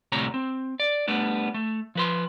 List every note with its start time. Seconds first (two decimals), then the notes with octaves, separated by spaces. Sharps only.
0.12 D2 A2 C3 G3 C#5 A#5
0.34 C4
0.80 D5
1.08 G3 A3 B3 D4
1.54 A3
1.95 F3 B4 C6